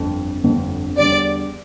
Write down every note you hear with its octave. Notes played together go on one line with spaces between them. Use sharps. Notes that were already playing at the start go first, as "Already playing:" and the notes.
Already playing: G1 F2 D3
G1 F2 D3
E2 D3 G3 D5